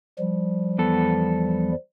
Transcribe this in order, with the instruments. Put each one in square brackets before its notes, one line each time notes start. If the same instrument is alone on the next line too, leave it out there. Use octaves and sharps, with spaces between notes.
[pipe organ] F3 G3
[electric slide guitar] E2 B3 A4